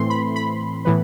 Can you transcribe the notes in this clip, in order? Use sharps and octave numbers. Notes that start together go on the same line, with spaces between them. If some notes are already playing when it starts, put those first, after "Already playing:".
Already playing: A2 E3 A3 C4 C6
B5
B5
A2 E3 B3